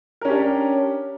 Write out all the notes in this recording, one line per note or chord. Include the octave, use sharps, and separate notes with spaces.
C#4 D4 G4 A#4